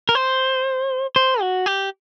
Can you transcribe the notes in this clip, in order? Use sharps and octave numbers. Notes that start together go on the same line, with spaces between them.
A#4
C5
C5
F#4
G4